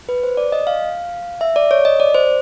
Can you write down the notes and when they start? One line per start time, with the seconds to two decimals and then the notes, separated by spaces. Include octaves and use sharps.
0.09 B4
0.23 C5
0.37 D5
0.52 D#5
0.67 F5
1.41 E5
1.56 D5
1.71 C#5
1.85 D#5
2.00 D5
2.14 C5